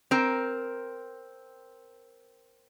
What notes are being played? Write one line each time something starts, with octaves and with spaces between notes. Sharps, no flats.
C4 A#4